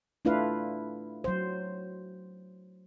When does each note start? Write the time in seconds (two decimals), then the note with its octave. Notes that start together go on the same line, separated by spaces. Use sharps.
0.25 A3 D4 E4 F4 B4 F5
1.24 F#3 C5